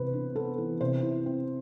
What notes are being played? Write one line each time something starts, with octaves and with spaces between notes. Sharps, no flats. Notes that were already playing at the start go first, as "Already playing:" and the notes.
Already playing: C3 E3 B3 B4 C5
D4
B3 A4
E3
C3 C5
E4
C4